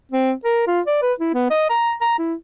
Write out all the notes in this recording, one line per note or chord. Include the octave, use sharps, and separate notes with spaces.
C4
A#4
F4
D5
B4
E4
B3
D#5
A#5
A#5
E4